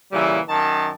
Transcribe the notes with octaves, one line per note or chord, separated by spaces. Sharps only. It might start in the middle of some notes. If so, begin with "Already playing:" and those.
A#2 C#3 E3 G3 E4
F#2 D#3 A5